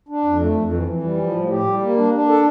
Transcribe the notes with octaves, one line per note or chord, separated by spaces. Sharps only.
D4
F2
A3
F2
E3
E3
G3
F3
A2
G4
G3
A#3
D4
D4
A4